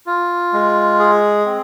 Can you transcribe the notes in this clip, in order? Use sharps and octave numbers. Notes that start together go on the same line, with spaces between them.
F4
G#3
G#4
C4